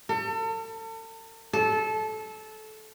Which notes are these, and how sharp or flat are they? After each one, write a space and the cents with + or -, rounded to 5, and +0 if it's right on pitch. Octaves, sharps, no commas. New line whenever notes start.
A4 +40
A4 -20